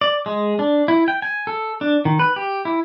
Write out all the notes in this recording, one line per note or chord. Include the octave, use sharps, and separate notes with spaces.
D5
G#3
D4
E4
G5
G#5
A4
D4
D#3
B4
G4
E4